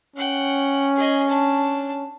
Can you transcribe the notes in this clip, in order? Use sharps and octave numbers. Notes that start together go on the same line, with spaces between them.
C#4 F#5 G5
G#4 D#5
D4 A5